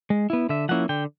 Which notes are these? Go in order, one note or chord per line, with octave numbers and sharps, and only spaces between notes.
G#3
B3 E4
D3 E5
F3 A#3 C#4 E4 F#5
D3 G5